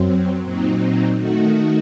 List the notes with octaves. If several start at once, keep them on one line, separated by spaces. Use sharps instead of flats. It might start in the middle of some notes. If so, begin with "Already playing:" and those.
Already playing: F#2 F#3 C4
A#2 F#3 C4 D#4
D#3 A3 D#4 F#4